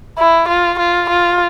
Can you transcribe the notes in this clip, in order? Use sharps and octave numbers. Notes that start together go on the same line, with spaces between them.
E4
F4
F4
F4